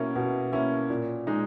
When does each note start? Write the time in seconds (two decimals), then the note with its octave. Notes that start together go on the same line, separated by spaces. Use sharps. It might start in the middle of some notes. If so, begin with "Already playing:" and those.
Already playing: B2 A#3 C#4 E4
0.16 B2
0.52 A#3 C#4 E4
0.90 A#2
1.27 G#3 D#4